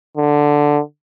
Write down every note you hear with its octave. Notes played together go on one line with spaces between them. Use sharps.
D3